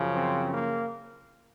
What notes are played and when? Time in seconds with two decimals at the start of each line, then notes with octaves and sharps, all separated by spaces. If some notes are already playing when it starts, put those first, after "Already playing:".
Already playing: F#2 C#3 F3
0.16 C4
0.53 A#3